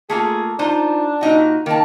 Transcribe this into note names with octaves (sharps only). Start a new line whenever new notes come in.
A3 A#3 F4 G#4
D4 D#4 F4 C5
A#2 D#4 F#4
D#3 A#3 A5